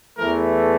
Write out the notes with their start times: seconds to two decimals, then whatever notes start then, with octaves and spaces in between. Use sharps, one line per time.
0.17 E2 E3 A3 A#4